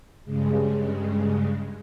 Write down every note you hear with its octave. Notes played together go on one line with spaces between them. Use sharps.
G2 C#3 G#3